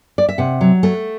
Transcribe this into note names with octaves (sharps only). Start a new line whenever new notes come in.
D5
E5
C3 F#5
F#3
A3